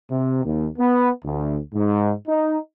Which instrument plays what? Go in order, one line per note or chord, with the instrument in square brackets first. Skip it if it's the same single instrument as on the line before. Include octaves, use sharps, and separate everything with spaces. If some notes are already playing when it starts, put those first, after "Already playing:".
[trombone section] C3
D#2
B3
D2
G#2
D#4